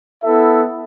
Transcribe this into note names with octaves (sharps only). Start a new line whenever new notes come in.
B3 E4 A4 E5